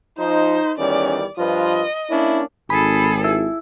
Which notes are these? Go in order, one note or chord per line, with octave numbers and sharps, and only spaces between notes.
F3 D#4 C5
E2 D#3 G3 C#4 D5
G2 F3 F4 B4 D#5
A#3 C#4 D4 E4
G#1 G#4 A4 B5
E4